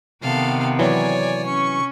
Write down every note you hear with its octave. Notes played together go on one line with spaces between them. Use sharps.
C3 D#3 B3 A4 F5
E3 F#3 C#5 D5 G#5
C#4 C#6